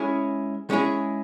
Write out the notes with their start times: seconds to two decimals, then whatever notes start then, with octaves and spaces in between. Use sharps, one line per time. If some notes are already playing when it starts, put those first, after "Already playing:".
Already playing: G#3 C#4 E4 G#4
0.70 G#3 C#4 E4 G#4